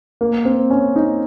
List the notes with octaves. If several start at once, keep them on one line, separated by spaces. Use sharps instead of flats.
A#3
C4
C#4
D#4